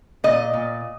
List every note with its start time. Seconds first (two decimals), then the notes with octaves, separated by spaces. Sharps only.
0.24 A#2 D#5
0.53 A#2